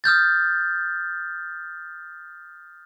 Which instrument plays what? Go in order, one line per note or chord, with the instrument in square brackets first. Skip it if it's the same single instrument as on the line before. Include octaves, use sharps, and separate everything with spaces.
[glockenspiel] D#6 F6 G6 A6